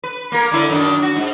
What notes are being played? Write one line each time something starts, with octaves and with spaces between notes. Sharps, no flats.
B4
A#3 A#4
D3 E4 D5
F#2 D#3 D4
F#4
G#2